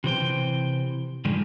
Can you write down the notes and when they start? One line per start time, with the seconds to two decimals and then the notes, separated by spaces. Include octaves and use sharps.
0.04 C3 E3 C5 G5
1.25 G2 D3 D#3 F3 G3 G#3